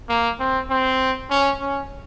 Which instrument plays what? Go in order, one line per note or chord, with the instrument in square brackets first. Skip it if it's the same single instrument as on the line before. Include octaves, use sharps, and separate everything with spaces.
[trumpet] A#3
C4
C4
C#4
C#4